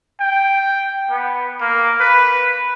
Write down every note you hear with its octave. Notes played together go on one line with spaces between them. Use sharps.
G5
B3
A#3
B4